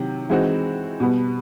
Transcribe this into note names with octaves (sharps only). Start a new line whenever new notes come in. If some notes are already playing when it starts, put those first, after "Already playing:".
Already playing: C3 D#3 F#3
E3 G#3 C4 D#4 F#4
B2 G3 B3